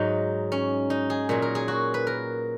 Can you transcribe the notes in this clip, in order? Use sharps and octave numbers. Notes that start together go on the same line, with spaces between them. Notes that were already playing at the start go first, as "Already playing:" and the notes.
Already playing: G#2 F#3 D#4
C#4
D#4
G#4
A#2 F#3 G#4
A#4
G#4
F#4
B4
A#4